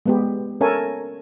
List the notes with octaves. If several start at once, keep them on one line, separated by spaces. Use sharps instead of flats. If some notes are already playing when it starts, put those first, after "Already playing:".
G#3 B3 G4
C#4 A4 A#4 C#5 E5 G#5